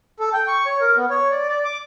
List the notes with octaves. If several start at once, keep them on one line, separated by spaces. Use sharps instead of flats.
A4
G5
C#6
C#5
A#4
B3
C#5
D5
D5
D6